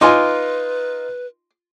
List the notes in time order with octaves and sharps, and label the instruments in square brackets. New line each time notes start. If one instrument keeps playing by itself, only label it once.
[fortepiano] D#4 F4 G#5 [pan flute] B4 [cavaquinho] C6 D6